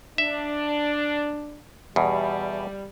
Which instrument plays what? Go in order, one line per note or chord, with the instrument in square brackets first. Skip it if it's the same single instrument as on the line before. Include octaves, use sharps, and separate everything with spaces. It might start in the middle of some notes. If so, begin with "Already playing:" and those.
[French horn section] D4 [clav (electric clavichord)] E5
[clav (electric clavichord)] E2 B2 [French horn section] G3